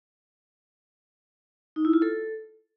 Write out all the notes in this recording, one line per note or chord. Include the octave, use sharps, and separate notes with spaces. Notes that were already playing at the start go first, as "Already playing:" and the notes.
D#4
E4
F4
A4